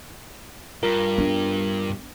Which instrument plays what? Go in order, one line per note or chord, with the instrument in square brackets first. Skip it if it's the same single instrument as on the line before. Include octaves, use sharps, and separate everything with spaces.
[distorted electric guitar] G2 [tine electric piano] F4 A#4
[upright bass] B3 D4